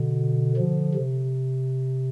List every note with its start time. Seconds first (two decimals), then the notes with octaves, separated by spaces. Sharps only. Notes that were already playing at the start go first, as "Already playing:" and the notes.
Already playing: B2 D3
0.57 D3 F3
0.95 C3